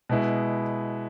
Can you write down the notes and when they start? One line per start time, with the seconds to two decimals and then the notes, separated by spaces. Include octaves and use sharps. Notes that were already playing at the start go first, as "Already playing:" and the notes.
0.09 B2 G#3 B3 E4